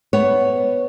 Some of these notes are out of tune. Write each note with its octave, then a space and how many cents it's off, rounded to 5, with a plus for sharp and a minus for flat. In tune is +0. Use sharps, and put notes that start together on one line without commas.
B3 +10 C#5 +0